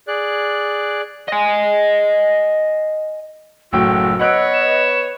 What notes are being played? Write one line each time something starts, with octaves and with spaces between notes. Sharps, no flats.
G#4 D5 F#6
D#5 G#5
F#1 A2 F#4 G5 E6
B3 B4 C#5 D#5 F#5 F#6 D7
E7